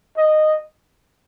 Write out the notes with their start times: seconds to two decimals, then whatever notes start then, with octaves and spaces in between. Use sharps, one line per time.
0.17 D#5